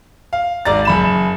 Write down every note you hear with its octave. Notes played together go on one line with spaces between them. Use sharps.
F5
G#1 D5 A#5 A6
F#1 B5 E7